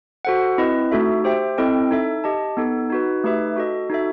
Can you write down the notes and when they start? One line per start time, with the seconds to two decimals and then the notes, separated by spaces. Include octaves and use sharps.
0.25 F#4 A4 C5 F#5
0.58 C4 E4 B4 D#5
0.91 A3 D#4 F#4 A4 E5
1.24 G4 C5 E5 G5
1.58 C4 E4 A4 D#5 G5
1.91 D#4 A4 E5
2.24 G4 D#5 A5
2.57 B3 D#4 A4
2.90 D#4 F#4 B4
3.24 A3 D#4 G4 B4 E5
3.56 F#4 A4 D#5
3.90 D#4 F#4 A4 E5